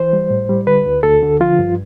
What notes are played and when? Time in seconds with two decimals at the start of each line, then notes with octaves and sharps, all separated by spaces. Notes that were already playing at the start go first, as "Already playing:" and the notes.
Already playing: E3 C5
0.13 G3
0.30 A2
0.49 G3
0.67 D3 B4
0.86 D2
1.03 D2 A4
1.23 D3
1.40 F3 F4
1.59 G2